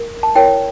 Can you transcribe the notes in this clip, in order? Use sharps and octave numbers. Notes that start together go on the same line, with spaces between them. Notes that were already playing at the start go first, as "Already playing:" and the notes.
Already playing: A#4
A5
E4 A#4 C#5 G5